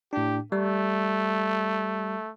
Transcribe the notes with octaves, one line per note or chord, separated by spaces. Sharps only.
A2 D4 G4
G3 A3